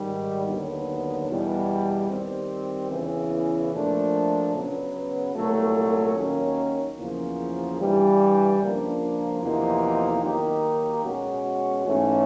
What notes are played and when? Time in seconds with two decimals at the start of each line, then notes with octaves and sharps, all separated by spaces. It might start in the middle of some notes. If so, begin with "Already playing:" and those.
Already playing: G#2 D#3 G3
0.47 D#2 D3 F#3 B3
1.28 E2 B2 G3
2.10 D#3 G3 C4
2.91 E2 C#3 E3
3.72 A#2 F3 A3 D4
4.53 C#3 F#3 B3
5.35 C2 A#2 F#3 A3
6.16 D#2 D#3 F#3 A#3 C#4
6.98 E2 C#3 F3 A#3
7.80 G2 E3 G3
8.60 C#2 C#3 F3 A#3 D4
9.41 E2 C3 F3 A#3 D#4
10.23 D#3 F#3 A#3 D#4 G4
11.05 B2 G#3 C#4 F#4
11.86 G#2 E3 A3 C#4